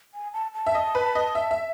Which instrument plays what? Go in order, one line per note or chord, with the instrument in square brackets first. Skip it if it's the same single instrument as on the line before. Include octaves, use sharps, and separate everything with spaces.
[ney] G#5
A5
A5
[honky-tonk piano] E5
D#5
B4
D#5
E5
E5